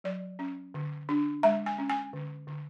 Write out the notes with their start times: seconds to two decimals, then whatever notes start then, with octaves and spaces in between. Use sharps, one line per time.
0.04 F#3 D5
0.39 C#4
0.74 D3
1.09 D4
1.43 G#3 E5
1.66 G#5
1.78 C#4
1.90 G#5
2.13 D3
2.47 D3